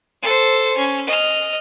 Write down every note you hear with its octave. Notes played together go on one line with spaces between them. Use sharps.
A4 C5
C#4
D#5 F6